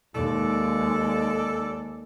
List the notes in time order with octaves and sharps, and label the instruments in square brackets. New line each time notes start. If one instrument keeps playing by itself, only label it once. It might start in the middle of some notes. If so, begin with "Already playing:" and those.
[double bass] D#2 G#3 [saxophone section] A4 D5